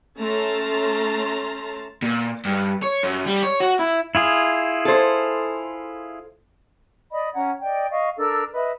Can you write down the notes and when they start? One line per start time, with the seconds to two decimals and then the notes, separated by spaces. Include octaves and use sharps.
0.19 A3 C#4 A5 A#5 C6
2.02 A#2
2.45 G2
2.82 C#5
3.03 F#2
3.26 G3
3.43 C#5
3.60 F#4
3.79 E4
4.15 E4 F4 G#4
4.85 A4 C5
7.11 D5 D#5 B5
7.35 C#4 F#5 A#5 G#6
7.62 D5 D#5 G5
7.91 D#5 F5 C#6
8.17 D4 A4 A#4 E6
8.54 B4 D#5 E5